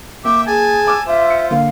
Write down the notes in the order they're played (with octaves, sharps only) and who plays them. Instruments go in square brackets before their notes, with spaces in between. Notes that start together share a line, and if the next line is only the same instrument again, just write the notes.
[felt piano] A#3 [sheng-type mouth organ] E5 G5 [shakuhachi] D6
[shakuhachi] G#4 [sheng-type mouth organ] G#5 A5
[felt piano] D6 E6
[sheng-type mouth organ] F4 C5 [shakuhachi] E5
[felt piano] C#7
[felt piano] D3 A#3 [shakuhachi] F5